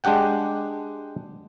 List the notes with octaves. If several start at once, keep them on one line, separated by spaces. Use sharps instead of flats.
G#3 D4 G4 F#5 G5